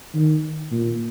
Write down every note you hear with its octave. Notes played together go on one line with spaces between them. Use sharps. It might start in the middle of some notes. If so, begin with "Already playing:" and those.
D#3
A#2